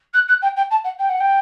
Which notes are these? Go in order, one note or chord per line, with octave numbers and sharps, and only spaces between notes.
F#6
F#6
G5
G5
A5
F#5
G5
F#5
G5